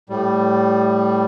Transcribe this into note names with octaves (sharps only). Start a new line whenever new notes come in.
A2 G3